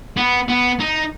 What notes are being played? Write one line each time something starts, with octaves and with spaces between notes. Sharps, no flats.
B3
B3
D#4